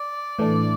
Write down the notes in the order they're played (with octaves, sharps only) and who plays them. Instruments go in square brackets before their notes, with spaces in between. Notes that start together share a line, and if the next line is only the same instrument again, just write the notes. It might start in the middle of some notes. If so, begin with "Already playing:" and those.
Already playing: [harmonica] D5
[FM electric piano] A2 E3 A3 D4